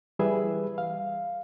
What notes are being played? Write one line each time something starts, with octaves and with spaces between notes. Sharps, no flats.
E3 G3 G#4 B4 E5
F5